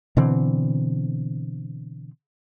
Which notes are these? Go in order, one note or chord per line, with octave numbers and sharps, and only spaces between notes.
B2 D3 E3 C4